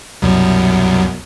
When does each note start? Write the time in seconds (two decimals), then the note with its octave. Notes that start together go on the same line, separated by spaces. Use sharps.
0.22 C2 F#2 B2